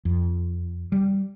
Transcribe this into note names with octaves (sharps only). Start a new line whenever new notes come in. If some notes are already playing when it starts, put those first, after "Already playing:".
F2
G3